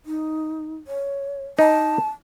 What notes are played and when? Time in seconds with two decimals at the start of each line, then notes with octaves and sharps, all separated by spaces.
0.06 D#4
0.87 C#5
1.59 D#4 A5